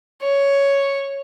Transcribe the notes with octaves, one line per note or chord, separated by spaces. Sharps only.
C#5